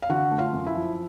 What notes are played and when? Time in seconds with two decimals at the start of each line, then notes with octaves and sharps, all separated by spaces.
0.02 F5
0.09 D3 F#4 F#5
0.31 A3
0.38 F4 F5
0.53 F#2
0.66 E4 E5
0.74 F3